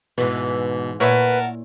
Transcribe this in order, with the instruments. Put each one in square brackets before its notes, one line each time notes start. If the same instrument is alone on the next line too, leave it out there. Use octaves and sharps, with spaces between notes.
[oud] G#2 E3 [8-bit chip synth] B2
[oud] A#2 E4 C#5 [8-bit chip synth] A#4 A5 [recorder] B4 [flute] F#5